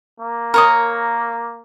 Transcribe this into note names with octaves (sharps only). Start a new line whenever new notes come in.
A#3
A#4 C#5 D#6